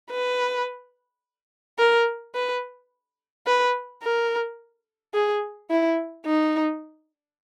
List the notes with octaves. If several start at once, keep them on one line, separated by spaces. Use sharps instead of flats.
B4
A#4
B4
B4
A#4
G#4
E4
D#4